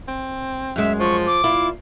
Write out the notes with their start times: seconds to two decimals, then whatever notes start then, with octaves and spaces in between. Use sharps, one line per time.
0.08 C4
0.76 F#2 G#3 E5
1.00 F3 C#6
1.26 D6
1.44 A#2 E4 F4